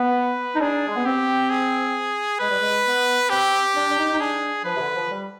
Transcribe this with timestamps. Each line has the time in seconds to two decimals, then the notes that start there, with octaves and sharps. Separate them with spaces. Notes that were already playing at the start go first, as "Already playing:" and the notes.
Already playing: B3 B4
0.55 D#4
0.60 D4 G#4
0.87 G#3
0.96 B3
1.04 C4 G4
1.50 G#4
2.40 G#3 B4
2.50 G3
2.60 G#3
2.85 B3
3.30 C4 G4
3.75 D4
3.89 D4
3.98 D#4
4.13 D#4
4.19 D4 G#4
4.65 F3 B4
4.76 C3
4.80 D3
4.95 F3
5.10 G3